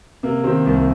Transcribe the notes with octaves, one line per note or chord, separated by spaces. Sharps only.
C3 A#3
D#3 C4
C2